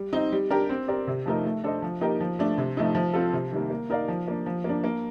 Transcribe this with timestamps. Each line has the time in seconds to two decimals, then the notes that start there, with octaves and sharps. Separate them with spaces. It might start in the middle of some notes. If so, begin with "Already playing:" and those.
Already playing: G3
0.13 C4 D#4
0.32 G3
0.50 D4 G4 A#4
0.70 C4
0.88 G4 A#4 D5
1.07 C3
1.26 F3 A3 D#4 A#4
1.45 A3
1.64 D4 A4 C5 D#5
1.82 F3
2.01 A#3 D#4 G4 A#4
2.20 F3
2.39 A3 D4
2.58 C3
2.77 F3 A3 D#4
2.95 F3
3.13 C4 F4 A4
3.33 C3
3.52 D#3 G3 A#3
3.70 A#3
3.90 D#4 A#4 D5 F5
4.08 F3
4.28 A#3 D4
4.46 F3
4.64 A#3
4.69 D4
4.84 A#3